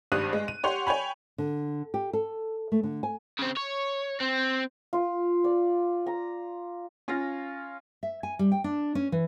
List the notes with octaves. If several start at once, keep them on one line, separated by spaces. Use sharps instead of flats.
G#1 G2 G3 D#6 F#6 D#7
G#3
D#7
G4 C#5 F#5 C6
C#5 G5 G#5 B5
D3
G4
A4
A3
D3
G#5
C#3 C4
C#5
C4
F4
D5
A#5
C#4 F4 F5 A#6
E5
G#5
G3
G5
D4
C#4
E3